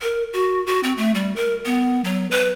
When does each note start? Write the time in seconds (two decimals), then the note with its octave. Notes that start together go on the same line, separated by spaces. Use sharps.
0.01 A#4
0.33 F#4
0.67 F#4
0.83 C4
0.97 A3
1.15 G3
1.36 A#4
1.65 B3
2.04 F#3
2.31 B4